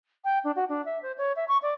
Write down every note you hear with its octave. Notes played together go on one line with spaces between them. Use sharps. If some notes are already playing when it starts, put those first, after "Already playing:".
G5
D4
F#4
D4
E5
C5
C#5
E5
C#6
D5